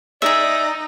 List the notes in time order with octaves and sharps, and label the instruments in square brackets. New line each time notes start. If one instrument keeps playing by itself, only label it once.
[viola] D#4 [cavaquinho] G#4 E5 [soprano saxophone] D5